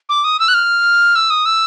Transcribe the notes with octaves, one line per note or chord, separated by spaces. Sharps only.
D6
D#6
E6
F#6
F6
E6
D#6
E6